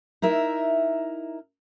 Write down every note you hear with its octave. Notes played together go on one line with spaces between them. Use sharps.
D#4 E4 A#4 E5